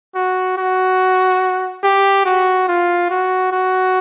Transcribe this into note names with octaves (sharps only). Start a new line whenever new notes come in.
F#4
F#4
G4
F#4
F4
F#4
F#4